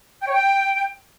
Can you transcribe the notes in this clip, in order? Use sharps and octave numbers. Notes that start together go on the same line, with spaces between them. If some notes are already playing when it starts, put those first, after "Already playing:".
G5
C#5
G5